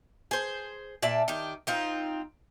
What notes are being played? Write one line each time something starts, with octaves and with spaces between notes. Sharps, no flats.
G#4 C5
A#2 D5 E5 A5
D#3 G4
C4 D#4 F4